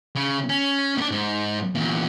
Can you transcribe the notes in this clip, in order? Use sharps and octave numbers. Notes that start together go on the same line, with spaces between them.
C#3
C#4
B3 D4
G#2
E2 A#2